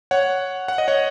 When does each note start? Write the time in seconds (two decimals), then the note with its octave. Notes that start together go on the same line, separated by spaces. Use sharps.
0.11 C#5 F#5
0.68 F#5
0.78 D#5
0.88 C#5 F#5